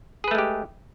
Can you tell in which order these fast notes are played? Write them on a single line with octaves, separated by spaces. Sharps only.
G#4 B4 A3 G#3 G4